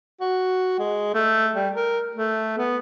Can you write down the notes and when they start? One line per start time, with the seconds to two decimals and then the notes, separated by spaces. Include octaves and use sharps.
0.20 F#4
0.79 G#3
1.14 A3
1.55 G3
1.75 A#4
2.15 A3
2.58 B3